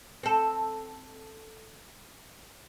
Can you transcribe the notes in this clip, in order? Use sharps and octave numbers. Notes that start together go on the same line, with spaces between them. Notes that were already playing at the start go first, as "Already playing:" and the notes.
C4 A4